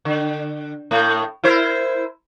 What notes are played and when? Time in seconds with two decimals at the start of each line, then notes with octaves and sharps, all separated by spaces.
0.05 D3
0.91 A2 A3
1.43 E4 A#4 C5